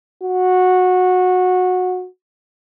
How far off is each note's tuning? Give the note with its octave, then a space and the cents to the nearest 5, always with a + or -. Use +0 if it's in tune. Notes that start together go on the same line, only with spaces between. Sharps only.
F#4 -15